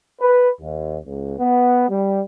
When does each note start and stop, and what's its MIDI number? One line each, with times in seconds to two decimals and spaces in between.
0.20 0.50 71
0.60 0.97 39
1.06 1.34 37
1.39 1.85 59
1.88 2.21 55